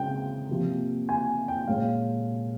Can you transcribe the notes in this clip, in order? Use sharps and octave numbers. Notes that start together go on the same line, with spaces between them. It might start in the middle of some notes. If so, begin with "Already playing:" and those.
Already playing: C#3 G#3 C4 G5
C3 F3 A#3
G#5
G5
A#2 G#3 C#4 F5